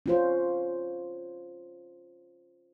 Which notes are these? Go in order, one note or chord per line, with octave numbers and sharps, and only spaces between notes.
C#4 F4 C5